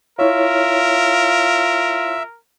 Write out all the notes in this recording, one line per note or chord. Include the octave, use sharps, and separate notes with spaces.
E4 F4 A#4 C#5 E5